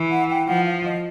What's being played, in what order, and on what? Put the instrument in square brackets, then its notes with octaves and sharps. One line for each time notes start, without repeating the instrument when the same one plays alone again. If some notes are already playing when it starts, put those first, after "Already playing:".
Already playing: [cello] E3
[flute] F#5
G5
[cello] F3 [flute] F#5
[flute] F5
D#5